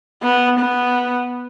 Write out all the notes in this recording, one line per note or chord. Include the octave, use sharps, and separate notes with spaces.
B3
B3